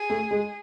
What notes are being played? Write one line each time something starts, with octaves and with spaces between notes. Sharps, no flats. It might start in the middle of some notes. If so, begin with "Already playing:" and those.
Already playing: G#4
A3
G#3